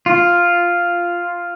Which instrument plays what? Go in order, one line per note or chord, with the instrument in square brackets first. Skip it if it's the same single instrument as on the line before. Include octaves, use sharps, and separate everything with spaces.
[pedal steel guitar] F4